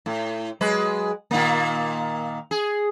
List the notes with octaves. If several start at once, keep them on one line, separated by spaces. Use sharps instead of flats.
A2
F#3 G#3 B4
A#2 D#3 A#3
G#4